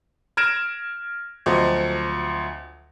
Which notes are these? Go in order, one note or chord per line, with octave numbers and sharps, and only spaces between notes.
F6 G#6 A#6 D7 E7
D2 F3 F#3 C4 D#5